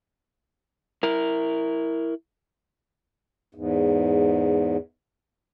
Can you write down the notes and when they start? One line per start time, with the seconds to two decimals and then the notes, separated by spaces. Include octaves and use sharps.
1.03 E4 A#4
3.55 E2 G#2